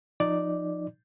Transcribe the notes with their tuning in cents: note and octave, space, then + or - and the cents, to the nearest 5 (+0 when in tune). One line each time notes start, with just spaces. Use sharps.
F3 +5 D#4 -10 D5 +0